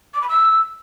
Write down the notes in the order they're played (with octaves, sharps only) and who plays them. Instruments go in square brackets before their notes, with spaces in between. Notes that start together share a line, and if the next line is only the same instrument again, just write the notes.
[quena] D6
B5
E6